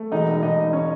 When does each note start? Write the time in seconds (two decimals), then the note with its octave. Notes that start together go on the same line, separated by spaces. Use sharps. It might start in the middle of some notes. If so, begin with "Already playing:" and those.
Already playing: A3
0.12 E1 D#4 D#5
0.43 E1 D#4 D#5
0.73 C#4 C#5